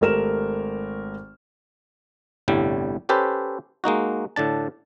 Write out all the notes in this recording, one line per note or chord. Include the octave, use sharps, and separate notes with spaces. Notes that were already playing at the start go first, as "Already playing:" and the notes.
G#1 A3 G4 A#4 F6 E7
G1 C2 A2 D3 G3
C#4 G4 A4 B4 C5
G#3 A#3 D#4 F#4
A2 D3 D4 A5